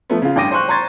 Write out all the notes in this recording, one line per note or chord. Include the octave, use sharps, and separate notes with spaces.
F3 A3 B3
C#3 F4
A1 G2 G5 D6 A#6 D#7
C5 C6 C#6 F#6
C5 A#5 C6 C#6 G#6 A6